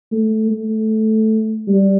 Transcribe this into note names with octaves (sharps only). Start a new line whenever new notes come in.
A3
A3
G3